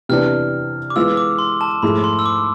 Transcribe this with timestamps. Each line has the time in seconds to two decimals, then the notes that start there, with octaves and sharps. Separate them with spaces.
0.09 C3 E3 B3 D4 F6
0.90 D6
0.96 E3 G#3 B3 F4 E6
1.17 D6
1.39 C6
1.61 A5
1.82 G#2 F3 A3 E4 G#4 B5
2.04 C6
2.19 E6
2.26 D6